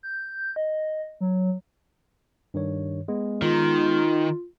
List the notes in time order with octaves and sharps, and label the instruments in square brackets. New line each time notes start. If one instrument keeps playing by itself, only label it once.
[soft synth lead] G6
D#5
F#3
[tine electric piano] G2 D#3 C#5
G#3 B3
[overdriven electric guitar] D#3 [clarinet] F4